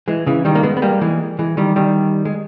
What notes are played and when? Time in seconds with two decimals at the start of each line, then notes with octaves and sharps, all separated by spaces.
0.08 E3 G#3
0.26 C#3 E3
0.45 D#3 G3
0.55 A#3
0.63 G#3 B3
0.77 B3
0.82 G3 A#3
1.01 E3 G#3
1.39 E3 G#3
1.57 D#3 G3
1.76 D#3 G3
2.25 G#3